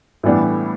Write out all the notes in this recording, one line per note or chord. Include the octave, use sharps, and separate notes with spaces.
A2 E3 G3 B3 D4